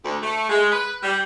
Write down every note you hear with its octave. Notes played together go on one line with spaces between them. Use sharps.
D2
A3
G#3
B4
G3